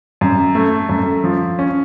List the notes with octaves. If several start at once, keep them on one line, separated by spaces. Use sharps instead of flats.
F#2
A3
F#2
F3
C#4